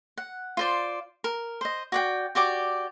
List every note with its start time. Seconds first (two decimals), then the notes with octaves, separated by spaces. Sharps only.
0.17 F#5
0.57 F4 C5 D5
1.24 A#4
1.61 C5 D#5
1.92 F#4 D5 G5
2.35 F#4 G4 D5 D6